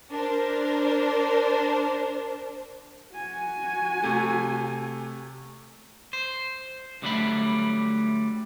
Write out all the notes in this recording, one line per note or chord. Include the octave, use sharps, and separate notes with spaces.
D4 A#4 C5
F#4 G#5
C3 A3
C5
G#2 D3 F#3 G3 A3 B5